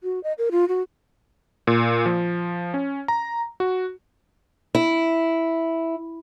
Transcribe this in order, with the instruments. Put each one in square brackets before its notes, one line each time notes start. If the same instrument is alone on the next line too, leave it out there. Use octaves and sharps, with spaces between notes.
[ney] F#4
D#5
A#4
F4
F#4
[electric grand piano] A#2
F3
C#4
A#5
F#4
[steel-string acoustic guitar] E4